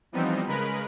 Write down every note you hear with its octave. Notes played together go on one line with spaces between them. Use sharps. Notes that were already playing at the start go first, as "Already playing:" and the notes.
E3 F3 G3 B3 C4 D#4
C#3 G#3 A#4 B4 B5